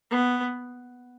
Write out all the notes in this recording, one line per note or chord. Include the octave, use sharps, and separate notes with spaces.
B3